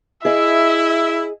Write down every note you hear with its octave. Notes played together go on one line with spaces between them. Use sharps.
E4 G#4 D#5 E5